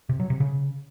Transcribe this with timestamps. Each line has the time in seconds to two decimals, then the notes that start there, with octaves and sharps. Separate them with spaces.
0.09 C3
0.20 F#3
0.30 C3
0.40 C#3